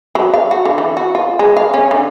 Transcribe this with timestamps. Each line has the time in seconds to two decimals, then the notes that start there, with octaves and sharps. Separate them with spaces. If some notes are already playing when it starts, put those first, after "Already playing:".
0.15 F#3
0.34 F5
0.51 F#4
0.65 D3
0.78 E3
0.97 F#4
1.15 F4
1.39 G#3
1.57 F5
1.74 C#4
1.91 D3